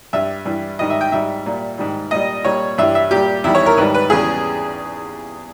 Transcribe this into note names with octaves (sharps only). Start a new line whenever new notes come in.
G2 G3 E5
G2 E3 G3
G#2 D#3 G3 D#5
E5
G5
G#2 G3 E5
A#2 G3
G#2 D#3 G3
A#2 G3 D#5
A#2 G3 C#5
G2 E3 G3 E5
E5
A#2 G3 G4
E2 D#3 G3 E4
C#5
A#4
G#2 D#3 G3 B4
B4
E2 C#3 G3 G#4